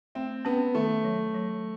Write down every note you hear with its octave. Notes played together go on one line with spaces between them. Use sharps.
A3 C4
B3 C#4
D#3 A3
F#3
F#3